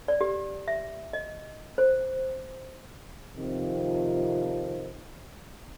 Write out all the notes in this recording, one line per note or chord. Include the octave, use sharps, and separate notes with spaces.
D5
G4
E5
D#5
C5
F2 C3 D#3 F3